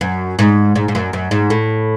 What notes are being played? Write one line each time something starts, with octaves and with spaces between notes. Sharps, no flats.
F#2
G#2
G#2
G#2
F#2
F#2
G#2
A2